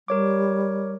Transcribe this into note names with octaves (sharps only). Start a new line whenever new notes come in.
G3 A#4 C#5 D6